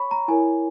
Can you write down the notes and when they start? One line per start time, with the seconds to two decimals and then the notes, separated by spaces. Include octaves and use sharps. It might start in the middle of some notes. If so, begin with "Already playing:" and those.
Already playing: C#5 B5 C#6
0.11 A#5
0.28 E4 A#4 C#5 G#5